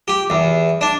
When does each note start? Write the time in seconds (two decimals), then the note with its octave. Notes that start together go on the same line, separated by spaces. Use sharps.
0.08 G4
0.30 E2
0.81 D4